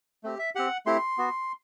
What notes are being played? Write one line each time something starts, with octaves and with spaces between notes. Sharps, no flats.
A3 C4 G4
E5
C4 G4 F#5
A3 C4 E4 G4 C6
B3 F#4